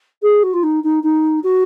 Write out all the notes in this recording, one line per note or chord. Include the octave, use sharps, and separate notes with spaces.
G#4
F#4
F4
D#4
D#4
D#4
F#4